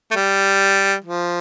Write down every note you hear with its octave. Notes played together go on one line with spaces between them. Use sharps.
A3
G3
F3